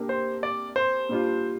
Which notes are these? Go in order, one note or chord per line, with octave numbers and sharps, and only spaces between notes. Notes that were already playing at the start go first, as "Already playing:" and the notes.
Already playing: C3 A#3 D4 G4
C5
D5
C5
A#2 G3 D4 F4